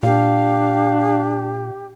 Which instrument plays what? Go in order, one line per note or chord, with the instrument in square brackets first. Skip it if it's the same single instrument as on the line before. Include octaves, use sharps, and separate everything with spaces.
[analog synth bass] A#2 [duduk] D4 [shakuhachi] G4 [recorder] F5